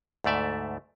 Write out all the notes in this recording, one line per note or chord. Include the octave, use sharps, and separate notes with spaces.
D2 G#2 A3 D5 E5